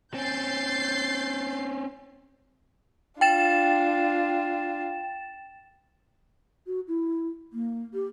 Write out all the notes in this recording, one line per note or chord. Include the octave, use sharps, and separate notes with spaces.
C4 C#4 G6 A6 C7
D4 F4 G5 A6 E7
F#4
E4
A#3
G4